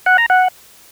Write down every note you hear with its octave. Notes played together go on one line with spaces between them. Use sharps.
F#5
A#5
F#5